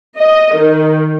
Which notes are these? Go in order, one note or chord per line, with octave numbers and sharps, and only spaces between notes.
D#5
D#3